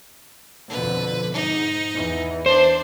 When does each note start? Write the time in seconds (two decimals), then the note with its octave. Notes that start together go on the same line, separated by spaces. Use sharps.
0.69 F2 B2 D3 B4
1.33 G#2 D#4
1.95 E2 E3
2.46 D4 C5